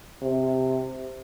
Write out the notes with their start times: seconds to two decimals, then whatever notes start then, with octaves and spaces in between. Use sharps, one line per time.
0.23 C3